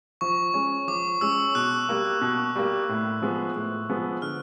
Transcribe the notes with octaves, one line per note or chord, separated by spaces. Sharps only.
F3 C#6
G#3 C#4
F3 D6
G#3 C#4 E6
B2 F#6
G3 A#3
B2
G3 A#3
A2
F3 G#3 B3
A2
F3 G#3 B3
D3 F6